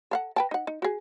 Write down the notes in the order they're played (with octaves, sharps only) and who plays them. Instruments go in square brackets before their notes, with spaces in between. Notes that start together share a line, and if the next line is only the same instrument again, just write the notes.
[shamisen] A4 F5 F#5
B4 G5 A5
D#4 F#5
D#4
F#4 G#4